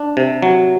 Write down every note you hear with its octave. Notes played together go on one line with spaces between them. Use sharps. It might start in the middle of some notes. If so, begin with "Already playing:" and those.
Already playing: D4
C3
F#3